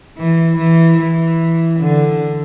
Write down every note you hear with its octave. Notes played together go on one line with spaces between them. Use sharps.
E3
E3
E3
D3